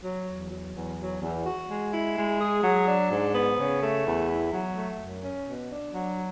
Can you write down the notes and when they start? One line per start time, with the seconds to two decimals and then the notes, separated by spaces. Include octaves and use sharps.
0.04 F#3
0.28 E2
0.51 F#3
0.75 E2
0.99 F#3
1.22 E2
1.46 F#4
1.70 G#3
1.93 E4
2.17 G#3
2.40 G#4
2.64 F#3
2.88 D4
3.11 G#2
3.35 B3
3.59 C#3
3.82 A3
4.06 E2
4.29 E4
4.53 F#3
4.77 A3
5.01 F#2
5.23 C#4
5.47 B2
5.71 D4
5.94 F#3